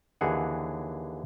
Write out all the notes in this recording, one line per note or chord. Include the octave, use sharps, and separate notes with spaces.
D#2 D3 E3 G#4 F#5